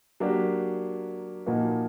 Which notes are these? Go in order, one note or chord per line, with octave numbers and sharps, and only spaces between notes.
F#3 A#3 D4 G4
A#2 F3 A#3 D#4 F#4